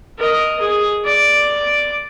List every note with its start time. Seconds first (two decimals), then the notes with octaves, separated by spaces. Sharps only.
0.18 A#4 D#5
0.61 G#4
1.04 D5 D6